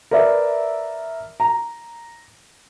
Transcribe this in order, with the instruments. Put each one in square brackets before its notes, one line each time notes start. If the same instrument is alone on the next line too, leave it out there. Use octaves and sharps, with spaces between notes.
[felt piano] A#4 B4 D5 E5
A#5